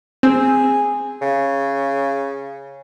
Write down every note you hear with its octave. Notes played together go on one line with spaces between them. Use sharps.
C4 G#4
C#3